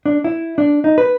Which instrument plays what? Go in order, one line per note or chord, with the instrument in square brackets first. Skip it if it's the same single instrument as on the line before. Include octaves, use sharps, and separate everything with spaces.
[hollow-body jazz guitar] D4
E4
D4
D#4
B4